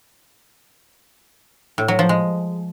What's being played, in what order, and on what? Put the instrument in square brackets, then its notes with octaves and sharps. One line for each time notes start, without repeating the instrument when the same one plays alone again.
[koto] A2
F#3
F3
G#3